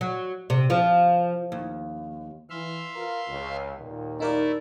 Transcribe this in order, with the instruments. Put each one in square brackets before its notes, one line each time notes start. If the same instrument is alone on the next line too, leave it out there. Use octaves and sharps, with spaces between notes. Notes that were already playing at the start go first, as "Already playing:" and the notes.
[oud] F#3
C3
F3
D#2
[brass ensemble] E3 [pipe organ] E5 F5 C6
[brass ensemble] F4 A#4 B4
C#2
D#2 A#2
[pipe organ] A3 E4 [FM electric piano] D#4 A#4 D5